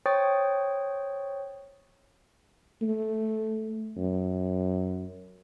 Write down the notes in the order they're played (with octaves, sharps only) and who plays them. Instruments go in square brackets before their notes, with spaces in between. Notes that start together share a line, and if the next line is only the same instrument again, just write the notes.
[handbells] C5 C#5 G5 C#6 D#6 A6
[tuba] A3
F#2